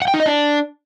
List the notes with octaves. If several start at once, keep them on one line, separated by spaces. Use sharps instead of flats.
F#5
G5
D#4
D#5
D4